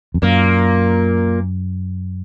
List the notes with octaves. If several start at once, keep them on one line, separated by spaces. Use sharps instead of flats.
F2
F#2 A#2 A#3